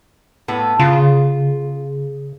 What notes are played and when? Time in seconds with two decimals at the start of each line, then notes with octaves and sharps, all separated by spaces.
0.48 A2 B3
0.79 C#3 F4